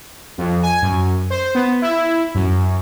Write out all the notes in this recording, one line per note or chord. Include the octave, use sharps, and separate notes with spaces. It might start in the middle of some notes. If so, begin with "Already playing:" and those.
F2
G#5
F#2
C5
B3
E4
F#2